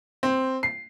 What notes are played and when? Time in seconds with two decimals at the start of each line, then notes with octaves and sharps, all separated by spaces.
0.23 C4
0.63 C7